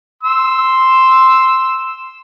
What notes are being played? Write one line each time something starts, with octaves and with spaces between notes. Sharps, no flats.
C6 E6